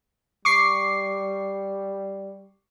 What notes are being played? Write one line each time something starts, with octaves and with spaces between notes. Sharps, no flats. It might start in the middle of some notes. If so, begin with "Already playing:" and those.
G3 C#6 D6 C7